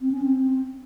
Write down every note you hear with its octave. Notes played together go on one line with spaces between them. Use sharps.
C4
C#4
C4